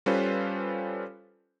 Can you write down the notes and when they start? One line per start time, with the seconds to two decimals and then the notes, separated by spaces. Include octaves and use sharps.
0.06 G3 C#4 F4 A4 B4 C5